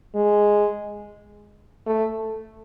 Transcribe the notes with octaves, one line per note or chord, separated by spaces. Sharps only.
G#3
A3